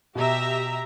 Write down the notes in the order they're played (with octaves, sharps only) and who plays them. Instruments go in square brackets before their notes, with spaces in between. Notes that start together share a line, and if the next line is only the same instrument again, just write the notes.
[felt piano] B2 [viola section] G4 E5 A#5